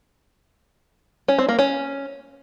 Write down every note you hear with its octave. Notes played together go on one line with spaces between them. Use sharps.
C#4
C4
A#3
C#4